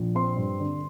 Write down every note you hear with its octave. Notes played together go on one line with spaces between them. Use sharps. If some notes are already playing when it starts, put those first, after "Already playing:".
Already playing: A#1
C4 C6
G2
D3